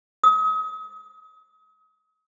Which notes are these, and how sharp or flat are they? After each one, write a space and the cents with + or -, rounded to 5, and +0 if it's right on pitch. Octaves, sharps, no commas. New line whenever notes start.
D#6 +35